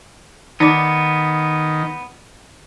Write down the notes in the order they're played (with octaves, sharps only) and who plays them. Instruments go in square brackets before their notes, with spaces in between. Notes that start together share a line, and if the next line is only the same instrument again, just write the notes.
[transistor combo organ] D#3 [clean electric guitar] B3 [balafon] D#4 D5 D6